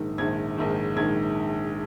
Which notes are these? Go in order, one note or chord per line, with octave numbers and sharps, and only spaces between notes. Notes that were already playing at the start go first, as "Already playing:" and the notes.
Already playing: A#1 G#2 D#3
A#1 G#2 D#3 G#6
A#1 G#2 D#3
A#1 G#2 D#3 G#6